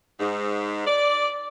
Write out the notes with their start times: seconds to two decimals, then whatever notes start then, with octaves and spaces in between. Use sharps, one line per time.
0.20 G#2
0.87 D5